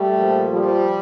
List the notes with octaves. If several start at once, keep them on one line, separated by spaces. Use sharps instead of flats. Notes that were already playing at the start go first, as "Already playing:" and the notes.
Already playing: G3 A3
A#2 F3
F3 G3